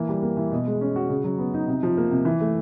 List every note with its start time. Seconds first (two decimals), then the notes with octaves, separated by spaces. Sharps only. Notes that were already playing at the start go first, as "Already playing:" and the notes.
Already playing: E3 A#3
0.09 G3
0.22 A#3
0.37 E3
0.52 B2
0.66 G#3
0.81 C#4
0.96 F#4
1.10 C#3
1.24 F#3
1.38 B3
1.54 D#4
1.68 C3
1.83 F3
1.97 A#3
2.11 C3
2.25 E3
2.40 A3